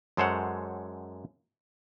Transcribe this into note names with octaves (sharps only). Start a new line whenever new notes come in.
F#2 G#3 A4 C5 C#5 F#5